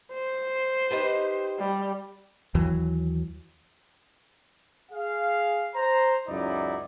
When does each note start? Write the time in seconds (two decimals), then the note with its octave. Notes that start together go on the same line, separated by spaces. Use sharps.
0.13 C5
0.91 D#4 G4 B4
1.59 G3
2.55 D#2 E3 F#3
4.92 G#4 F5
5.75 C5 A#5
6.28 C#2 F#2 D#4 E4 D5